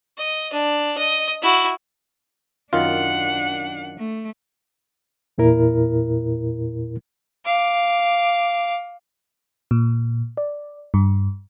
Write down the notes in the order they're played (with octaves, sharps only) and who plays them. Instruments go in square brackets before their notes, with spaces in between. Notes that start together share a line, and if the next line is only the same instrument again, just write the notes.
[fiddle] D#5
D4
D#5
E4 F#4
[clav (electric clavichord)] F#2 D#3 F4 [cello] D4 F#5
[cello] A3
[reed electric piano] E2 A#2 E4 A#4
[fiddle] F5 D6
[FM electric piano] A#2
D5
G2